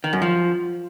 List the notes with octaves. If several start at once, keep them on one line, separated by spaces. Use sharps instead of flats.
D#3
F#2
F3